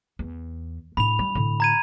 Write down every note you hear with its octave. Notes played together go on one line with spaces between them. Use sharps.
E2
A2 D4 B5 F7
G3
A2 D3
A#5 G#6 D#7